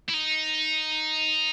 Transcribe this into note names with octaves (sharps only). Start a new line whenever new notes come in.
E4
D#4